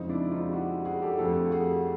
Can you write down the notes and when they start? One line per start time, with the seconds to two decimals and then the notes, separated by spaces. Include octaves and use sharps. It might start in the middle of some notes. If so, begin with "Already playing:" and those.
Already playing: F2 C#3 F3 G#3 C4 D#4
0.09 D4 E4
0.31 D#4 F4
0.48 G4
0.52 E4 F#4
0.85 F#4 G#4
1.02 G4 A4
1.18 F2 D3 F3 A3 G4 A4
1.51 F#4 G#4